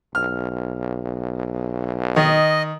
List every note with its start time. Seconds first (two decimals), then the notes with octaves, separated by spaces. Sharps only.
0.15 B1 F6
2.16 D#3 D#5